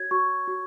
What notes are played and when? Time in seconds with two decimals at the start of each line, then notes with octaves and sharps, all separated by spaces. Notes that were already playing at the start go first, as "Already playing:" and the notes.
Already playing: F#4 C#5 G#6
0.11 F#4 C#6
0.47 F#4